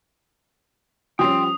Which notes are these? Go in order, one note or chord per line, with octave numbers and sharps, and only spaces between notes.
F3 G3 C#4 G5 C6 D#6